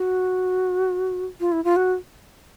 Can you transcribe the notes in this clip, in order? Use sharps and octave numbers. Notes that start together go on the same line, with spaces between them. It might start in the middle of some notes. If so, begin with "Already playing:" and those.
Already playing: F#4
F4
E4
F4
F#4